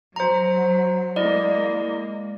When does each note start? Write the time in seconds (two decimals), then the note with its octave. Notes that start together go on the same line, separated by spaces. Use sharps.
0.16 F#3 C5 A#5
1.16 G#3 A#3 E4 D5 D#5